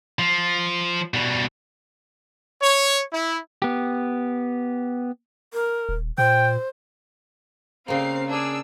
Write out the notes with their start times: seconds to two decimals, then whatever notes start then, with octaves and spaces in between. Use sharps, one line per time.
0.19 F3
1.14 B2 G3
2.61 C#5
3.12 E4
3.62 B3 G4
5.54 A#4
5.89 D#1
6.18 A#2 C5 G5
7.88 C#3 A#3 C4 F5 C7
8.29 D4 G#4 E6